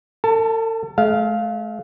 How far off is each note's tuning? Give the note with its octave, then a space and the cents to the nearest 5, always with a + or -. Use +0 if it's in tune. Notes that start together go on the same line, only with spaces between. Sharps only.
A4 +45 A5 +0
A3 -45 F5 +0